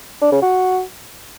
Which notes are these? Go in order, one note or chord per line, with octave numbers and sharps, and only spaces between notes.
D4
C#3
F#4